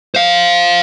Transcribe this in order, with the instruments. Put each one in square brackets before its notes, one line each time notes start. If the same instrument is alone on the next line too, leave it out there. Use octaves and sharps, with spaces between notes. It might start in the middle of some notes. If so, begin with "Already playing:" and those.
[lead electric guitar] C5 F5